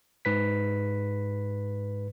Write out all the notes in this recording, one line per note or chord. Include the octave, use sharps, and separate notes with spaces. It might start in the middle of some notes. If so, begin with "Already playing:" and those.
G#2 B4 B6